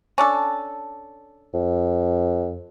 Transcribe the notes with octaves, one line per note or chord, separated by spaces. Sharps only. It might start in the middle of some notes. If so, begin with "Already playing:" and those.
C#4 D4 A4
F2